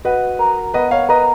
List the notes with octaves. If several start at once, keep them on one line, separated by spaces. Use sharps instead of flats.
F#4 B4 D#5
A#4
B3 B4 D#5
C#5 F5
A#4 B4 D#5